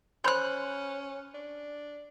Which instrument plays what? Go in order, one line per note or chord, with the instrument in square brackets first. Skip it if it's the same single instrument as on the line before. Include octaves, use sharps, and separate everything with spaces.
[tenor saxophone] C#4 [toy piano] C5 B5 C6 [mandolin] F#6 G6
[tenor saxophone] D4